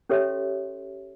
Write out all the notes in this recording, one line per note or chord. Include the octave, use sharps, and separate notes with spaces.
C#4 G4 A4 C#5 E5 C6